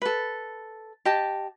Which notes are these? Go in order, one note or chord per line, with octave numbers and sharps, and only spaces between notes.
A4 B4
G4 D#5 A5